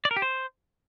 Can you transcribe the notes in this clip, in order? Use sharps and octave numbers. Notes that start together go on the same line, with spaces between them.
D5
A#4
G4
C5